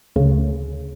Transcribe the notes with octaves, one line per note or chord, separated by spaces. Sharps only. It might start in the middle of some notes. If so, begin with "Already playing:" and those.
D2 C#3